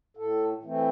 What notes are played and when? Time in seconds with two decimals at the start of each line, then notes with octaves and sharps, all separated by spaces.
0.17 A2 A4
0.63 E3 A3 C4